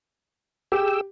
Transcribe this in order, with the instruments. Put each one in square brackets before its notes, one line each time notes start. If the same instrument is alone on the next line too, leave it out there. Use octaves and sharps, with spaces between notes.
[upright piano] G4 [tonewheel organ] G#4 G5 E6